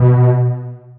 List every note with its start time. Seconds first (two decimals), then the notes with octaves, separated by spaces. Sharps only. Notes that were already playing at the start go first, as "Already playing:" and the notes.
Already playing: B2